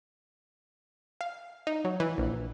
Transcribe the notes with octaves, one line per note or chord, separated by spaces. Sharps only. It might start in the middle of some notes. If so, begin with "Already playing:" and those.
F5
D#4
F#3
E3
A#1